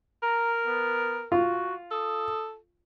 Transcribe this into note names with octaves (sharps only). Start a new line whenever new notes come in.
A#4 A#5
B3
F4 F#4
A4 D#6